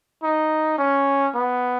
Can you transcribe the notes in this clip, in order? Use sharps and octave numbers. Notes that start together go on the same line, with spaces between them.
D#4
C#4
B3